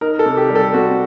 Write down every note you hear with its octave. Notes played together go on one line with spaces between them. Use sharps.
D#4 A#4
A4
C3
G4
G3
A4
C4 F#4